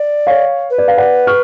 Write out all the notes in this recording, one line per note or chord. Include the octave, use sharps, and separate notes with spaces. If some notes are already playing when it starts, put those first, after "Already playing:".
Already playing: D5
C#5 F5
B4
D5
F5
D5 F#5
C#6 F6